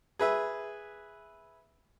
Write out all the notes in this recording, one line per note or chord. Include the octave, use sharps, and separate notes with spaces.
G#4 B4 E5